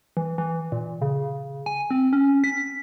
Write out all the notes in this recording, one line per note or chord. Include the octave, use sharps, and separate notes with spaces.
E3
E3
A#2
C#3
G#5
C4
C#4
B6